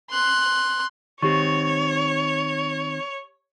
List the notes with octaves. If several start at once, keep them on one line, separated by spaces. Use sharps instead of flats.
C6 F#6
D#3 C4 G4 C#5 C#6